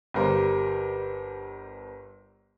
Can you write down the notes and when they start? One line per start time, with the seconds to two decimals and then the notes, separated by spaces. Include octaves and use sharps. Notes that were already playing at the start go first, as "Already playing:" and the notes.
0.14 G1 G3 A#4 C5 D6